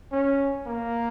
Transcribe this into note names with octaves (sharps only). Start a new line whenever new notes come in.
C#4
A#3